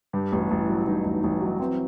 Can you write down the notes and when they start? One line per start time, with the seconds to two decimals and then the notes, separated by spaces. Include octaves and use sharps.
0.13 G2 G4
0.32 A1
0.39 F#4
0.51 A1
0.62 E4
0.69 F#3
0.86 G2 D#4
1.05 A1
1.24 A1
1.41 F#3
1.60 E3 C4